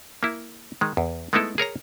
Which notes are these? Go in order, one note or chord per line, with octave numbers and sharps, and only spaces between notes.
A#3 E4
D#3 G#3
E2
G#3 A3 B3 D#4 E4 A4
G#4 A#4 C#5 A#5